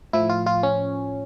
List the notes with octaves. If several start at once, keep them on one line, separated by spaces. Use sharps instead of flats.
A2 F3 E4
F4
F4
C#4